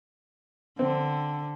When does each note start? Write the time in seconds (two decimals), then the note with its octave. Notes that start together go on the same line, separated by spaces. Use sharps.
0.79 D3 C4